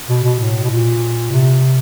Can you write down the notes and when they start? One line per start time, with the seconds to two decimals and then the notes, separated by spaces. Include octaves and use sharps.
0.09 B2
0.24 B2
0.40 A2
0.63 B2
0.70 A#2
1.31 C3